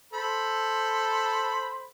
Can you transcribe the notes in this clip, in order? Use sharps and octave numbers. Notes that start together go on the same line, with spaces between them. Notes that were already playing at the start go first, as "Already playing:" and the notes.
A4 C5 B5